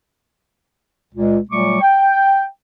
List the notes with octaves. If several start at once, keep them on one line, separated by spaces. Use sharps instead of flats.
C#2 A#2 G#3
A#2 F#3 G3 A3 C#6 D6
G5